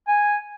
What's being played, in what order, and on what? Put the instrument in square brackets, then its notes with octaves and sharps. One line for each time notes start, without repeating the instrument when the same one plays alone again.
[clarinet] G#5